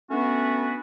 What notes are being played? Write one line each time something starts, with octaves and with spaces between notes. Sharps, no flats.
A3 B3 C#4 D4 F#4 B4